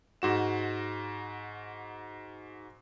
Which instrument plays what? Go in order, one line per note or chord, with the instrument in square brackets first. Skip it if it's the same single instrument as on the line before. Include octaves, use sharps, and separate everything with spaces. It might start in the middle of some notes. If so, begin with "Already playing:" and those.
[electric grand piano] G#2 F#4 E7